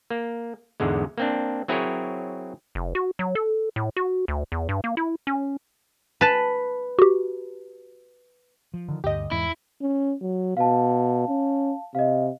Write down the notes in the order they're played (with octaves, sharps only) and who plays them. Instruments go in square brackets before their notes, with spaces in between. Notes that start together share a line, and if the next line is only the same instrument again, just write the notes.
[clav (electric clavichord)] A#3
E2 G#2 D3 G#3
A#3 C4 D4
F#3 C4 E4 G#4 A#4 C#5
[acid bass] F1
F#4
F#3
A4
A2
F#4
D2
E2
G2
A#3
E4
C#4
[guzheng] B4 A5
[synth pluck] F#4 G4
[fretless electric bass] F3
[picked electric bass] D3 D#3
[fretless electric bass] D2 G2 [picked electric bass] D3 [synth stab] G4 D#5
[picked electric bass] E2 [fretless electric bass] G#2 E3 [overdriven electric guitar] E4
[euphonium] C#4
F#3
[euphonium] B2 [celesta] F5 A5
[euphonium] C#4
[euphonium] C3 [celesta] D#5 F5